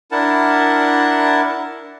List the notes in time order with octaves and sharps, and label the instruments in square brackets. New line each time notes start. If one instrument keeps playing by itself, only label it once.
[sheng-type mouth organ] D4 E4 A#4 F#5 A5